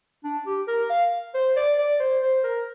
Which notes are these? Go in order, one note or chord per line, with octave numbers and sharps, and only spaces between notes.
D4
G4
A#4
F5
C5
D5
D5
C5
C5
A#4